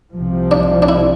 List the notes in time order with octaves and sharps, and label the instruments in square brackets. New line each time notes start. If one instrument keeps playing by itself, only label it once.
[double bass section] C2 C3 F3
[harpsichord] D4
D4
E4